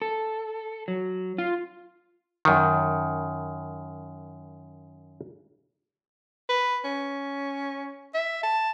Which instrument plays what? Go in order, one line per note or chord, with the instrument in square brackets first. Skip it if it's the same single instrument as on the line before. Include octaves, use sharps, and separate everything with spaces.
[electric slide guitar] A4
F#3
F4
[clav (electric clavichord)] F#2 D#3
[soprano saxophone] B4
C#4
E5
A5